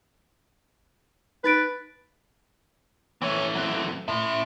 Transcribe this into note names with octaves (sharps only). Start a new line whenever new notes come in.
D#4 B4 A6 D7
E3 A3 C4 C#5
F#3 C4
A2 E5 C6